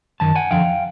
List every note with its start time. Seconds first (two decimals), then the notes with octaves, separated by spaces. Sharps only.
0.20 F#2 D#3 A5
0.36 F#5 G#5
0.51 F2 D3 F3 F5 G5